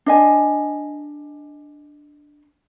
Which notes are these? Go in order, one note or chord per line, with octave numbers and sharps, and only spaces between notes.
D4 D#5 G#5